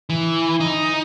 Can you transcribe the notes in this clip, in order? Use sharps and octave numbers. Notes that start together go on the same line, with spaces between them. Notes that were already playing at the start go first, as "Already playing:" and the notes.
E3
D#4